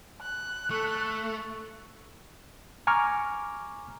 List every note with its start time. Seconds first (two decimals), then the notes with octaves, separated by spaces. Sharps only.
0.22 F#6
0.71 A3 A4 C#6 C#7
2.87 G#5 A#5 C#6 D6 F6